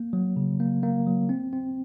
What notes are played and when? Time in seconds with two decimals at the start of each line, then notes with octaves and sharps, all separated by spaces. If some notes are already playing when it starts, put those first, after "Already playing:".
Already playing: A#3
0.13 F#3
0.37 C#3
0.60 A#3
0.83 A#3
1.07 F#3
1.29 C4
1.53 C4